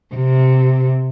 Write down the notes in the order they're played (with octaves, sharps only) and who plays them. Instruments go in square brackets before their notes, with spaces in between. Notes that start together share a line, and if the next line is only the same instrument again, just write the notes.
[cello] C3